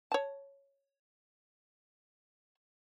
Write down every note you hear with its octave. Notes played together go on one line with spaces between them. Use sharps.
C#5 A5